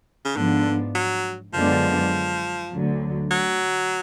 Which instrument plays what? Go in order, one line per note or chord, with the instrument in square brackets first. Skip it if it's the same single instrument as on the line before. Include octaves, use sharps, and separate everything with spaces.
[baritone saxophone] C#3
[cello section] G#2 F3 B3 D4 [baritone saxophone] D3
[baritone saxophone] F#3
[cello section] F#2 D3 G#3 B3 D4 [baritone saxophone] F3
[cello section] D2 D3 F#3
[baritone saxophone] F#3